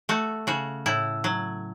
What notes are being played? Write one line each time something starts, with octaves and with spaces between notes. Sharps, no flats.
A3 F#4
C#3 F#4
A2 E4
F#3